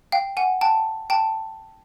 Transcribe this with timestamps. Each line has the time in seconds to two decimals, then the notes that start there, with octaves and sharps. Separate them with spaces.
0.12 F5 G5
0.37 F#5 G#5
0.61 G5 A5
1.10 G5 A5